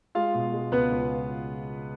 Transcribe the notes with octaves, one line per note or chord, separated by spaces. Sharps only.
G#3 F4 F5
B2
G#3
C#2 B3 B4
C#2